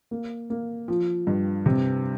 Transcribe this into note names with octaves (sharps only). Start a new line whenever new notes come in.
A#3
A#3
F3
G2
C3